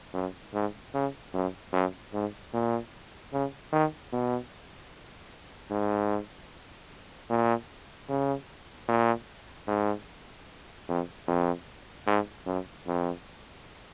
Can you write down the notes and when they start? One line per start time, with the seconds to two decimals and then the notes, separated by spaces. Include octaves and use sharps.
0.14 F#2
0.54 G#2
0.94 C#3
1.34 F#2
1.73 F#2
2.13 G#2
2.53 A#2
3.33 C#3
3.73 D#3
4.12 B2
5.71 G#2
7.30 A#2
8.09 C#3
8.88 A#2
9.68 G#2
10.88 F2
11.27 F2
12.07 G#2
12.46 F#2
12.86 F2